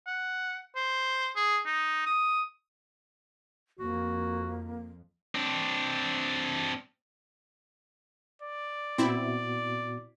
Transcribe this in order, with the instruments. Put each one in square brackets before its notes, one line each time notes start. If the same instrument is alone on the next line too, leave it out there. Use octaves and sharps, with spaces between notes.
[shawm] F#5
C5
G#4
D#4
D#6
[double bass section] F2 [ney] A#3 [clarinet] F#4
[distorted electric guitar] C4 D4
[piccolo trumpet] D5
[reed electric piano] A#2 B3 F#4 [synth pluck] C4 E4